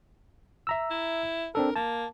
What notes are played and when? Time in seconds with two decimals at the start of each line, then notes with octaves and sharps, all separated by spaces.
0.67 E5 A#5 E6
0.91 E4
1.55 C4 D4 A4 A#4
1.76 A#3 A5